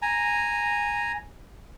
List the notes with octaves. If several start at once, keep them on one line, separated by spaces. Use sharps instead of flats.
G#5 A#5